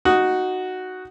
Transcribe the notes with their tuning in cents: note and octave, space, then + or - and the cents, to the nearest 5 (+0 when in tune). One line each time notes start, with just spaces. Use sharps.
D#4 +0 F#4 +0 D#6 +0